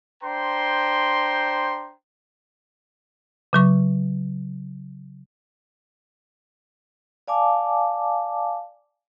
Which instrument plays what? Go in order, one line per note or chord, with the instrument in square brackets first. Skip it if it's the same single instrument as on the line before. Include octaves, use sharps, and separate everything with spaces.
[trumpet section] D4 C5 G5 A#5 C6
[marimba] C#3 F#3 C#6
[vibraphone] D5 F5 G#5 A5 D6